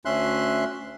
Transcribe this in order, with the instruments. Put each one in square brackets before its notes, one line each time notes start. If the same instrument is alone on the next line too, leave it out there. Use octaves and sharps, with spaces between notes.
[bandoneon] D2 C#4 E5 C6 F#6